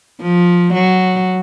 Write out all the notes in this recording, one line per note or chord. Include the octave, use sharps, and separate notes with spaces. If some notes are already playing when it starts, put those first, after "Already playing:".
F3
F#3